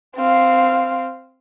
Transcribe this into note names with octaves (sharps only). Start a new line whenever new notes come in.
C4 F5